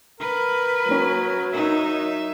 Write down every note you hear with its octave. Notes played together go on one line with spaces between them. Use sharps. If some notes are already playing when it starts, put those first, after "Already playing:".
A#4 B4
F#3 A#3 C#4
D#4 A#4 E5